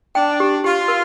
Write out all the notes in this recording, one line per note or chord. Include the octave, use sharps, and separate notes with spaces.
D4 G5
G4
F4 G4
A#4